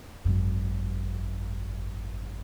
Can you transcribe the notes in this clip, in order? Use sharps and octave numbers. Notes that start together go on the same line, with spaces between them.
G#1 F#2